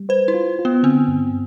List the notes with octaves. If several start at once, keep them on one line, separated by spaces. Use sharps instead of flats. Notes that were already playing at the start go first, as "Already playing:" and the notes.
Already playing: G3
B4 C5
E4
F4
F4
B3
D3 C4
G2